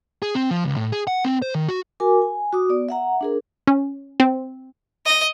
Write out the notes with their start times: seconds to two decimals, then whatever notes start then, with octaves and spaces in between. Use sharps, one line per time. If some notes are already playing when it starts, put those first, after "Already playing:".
0.22 G#4
0.35 C4
0.51 F3
0.64 C#2
0.76 A2
0.92 G#4
1.07 F#5
1.25 C4
1.42 C5
1.55 D#3
1.69 F#4
2.00 F#4 A#4 G#5 D6
2.22 G#5
2.53 F#4 D6 D#6
2.69 B3 D5
2.89 E5 F#5 A#5
3.21 D4 G#4 A#4
3.67 C#4
4.20 C4
5.06 D#5